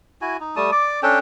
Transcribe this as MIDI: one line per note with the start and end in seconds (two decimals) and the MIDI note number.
0.21 0.37 64
0.21 0.37 66
0.21 0.37 80
0.40 0.55 63
0.56 0.71 55
0.56 0.71 57
0.56 0.71 81
0.56 0.71 87
0.72 1.00 74
0.72 1.00 86
1.03 1.19 61
1.03 1.19 62
1.03 1.19 69
1.03 1.19 79